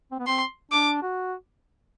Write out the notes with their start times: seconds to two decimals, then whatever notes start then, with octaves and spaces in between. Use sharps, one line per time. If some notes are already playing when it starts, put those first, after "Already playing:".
0.12 C4
0.19 B3
0.27 C4 C6
0.72 D4 D6
1.02 F#4